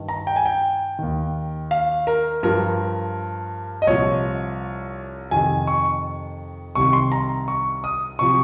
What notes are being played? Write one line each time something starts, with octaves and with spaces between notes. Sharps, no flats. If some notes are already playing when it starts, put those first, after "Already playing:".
Already playing: G2 D#3
A#5
G5
G#5
G5
D#2 D#3
F5
A#4
G2 F3 A#4
D#5
C2 A#2 F3 C#5
F2 C3 D#3 G#5
C#6
C2 C3 D#3 C#6
C6
A#5
C#6
D#6
C3 F3 C#6